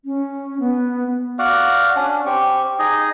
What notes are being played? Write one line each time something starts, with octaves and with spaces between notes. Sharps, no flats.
C#4
B3
F#4 D5 F5 F#5
C#4 D4
C4 G4 C#6
D#4 G#4 D#5